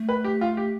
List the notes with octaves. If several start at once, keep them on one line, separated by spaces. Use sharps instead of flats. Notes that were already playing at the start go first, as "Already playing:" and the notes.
Already playing: A3
B4
G4
F4
G4